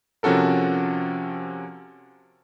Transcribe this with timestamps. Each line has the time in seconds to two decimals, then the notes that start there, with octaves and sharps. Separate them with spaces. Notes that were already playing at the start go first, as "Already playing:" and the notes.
0.23 C3 F3 C#4 F#4 A4 A#4